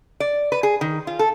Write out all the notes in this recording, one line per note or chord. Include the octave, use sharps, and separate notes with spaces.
D5
B4
G#4
D#3
F4
A4